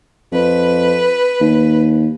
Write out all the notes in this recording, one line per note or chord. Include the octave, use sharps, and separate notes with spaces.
F2 B4
D#2